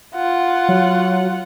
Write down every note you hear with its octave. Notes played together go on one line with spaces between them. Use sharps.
F4 F#5
F#3